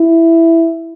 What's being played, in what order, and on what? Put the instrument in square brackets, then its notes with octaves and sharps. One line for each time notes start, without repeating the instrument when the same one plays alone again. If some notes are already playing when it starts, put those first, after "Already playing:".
Already playing: [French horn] E4